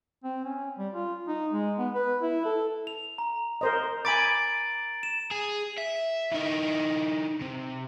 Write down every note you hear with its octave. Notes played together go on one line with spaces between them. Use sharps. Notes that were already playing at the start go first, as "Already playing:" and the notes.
C4
C#4
G3
F4
D#4
G#3
B3
B4
E4
A4
F7
A#5
A#4 C5 D#5
G#5 B5 D6 A6 D7 F#7
E7
G#4
E5
E3 D#4
C3